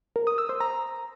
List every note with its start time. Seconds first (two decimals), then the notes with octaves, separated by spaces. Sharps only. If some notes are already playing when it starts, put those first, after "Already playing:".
0.16 A#4
0.27 D#6
0.38 E6
0.49 C5
0.60 A#5